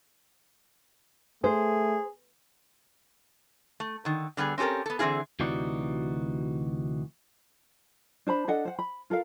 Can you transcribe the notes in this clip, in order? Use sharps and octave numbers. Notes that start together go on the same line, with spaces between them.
A3 G#4 C5
A3
D3 D#3
D3 G3 B3 G#4
C4 C#4 G4 A4 A#4
B3 A4
D3 E3 C4 F4 G#4
D2 C3 E3 D#4 F#4 D5
D4 C5 A5 B5
D4 A4 D#5 F#5
C5 F#5
B5
F4 A4 A#4 F5